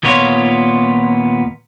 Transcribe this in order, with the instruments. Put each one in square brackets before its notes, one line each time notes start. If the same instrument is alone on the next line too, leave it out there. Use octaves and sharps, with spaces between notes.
[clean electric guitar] D#2 A#2 B3 F4 C#5